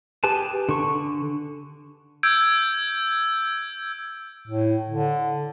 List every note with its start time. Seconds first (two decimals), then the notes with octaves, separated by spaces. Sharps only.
0.24 G4 G#4 B4 G#5 A5
0.69 D3 C#6
2.23 E6 G6 G#6 D7
4.48 A2
4.90 D3